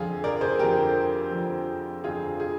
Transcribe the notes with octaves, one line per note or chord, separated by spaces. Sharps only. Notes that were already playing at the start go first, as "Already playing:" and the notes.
Already playing: F2 D3 F3 F4 G#4
A#4 D5
G#4 C5
F2 D3 F3 G4 A#4
F2 D3 F3
F2 D3 F3 F4 G#4
F4 G#4